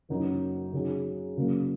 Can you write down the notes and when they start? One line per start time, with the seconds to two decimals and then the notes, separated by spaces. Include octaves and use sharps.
0.09 F#1 F#2 F#3 D#4
0.73 C#3 F#3 D#4 G#4
1.37 F#1 F#2 C#3 F#3 A#3